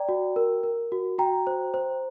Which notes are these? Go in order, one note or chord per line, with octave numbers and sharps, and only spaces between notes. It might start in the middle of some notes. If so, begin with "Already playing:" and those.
Already playing: D5 G5 A#5
F#4
A#4
A#4
F#4
F#4 G5 A#5
C5
C5